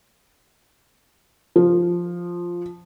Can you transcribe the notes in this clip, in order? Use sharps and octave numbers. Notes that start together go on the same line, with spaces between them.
F3